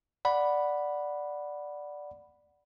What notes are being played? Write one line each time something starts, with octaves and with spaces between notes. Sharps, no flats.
D5 F#5 B5